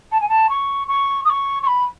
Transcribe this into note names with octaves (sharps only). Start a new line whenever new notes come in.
A5
G#5
A5
C#6
C#6
D#6
C#6
C#6
B5